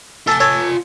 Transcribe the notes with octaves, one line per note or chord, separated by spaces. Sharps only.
F4 A4 G#5 A5
A4 C#5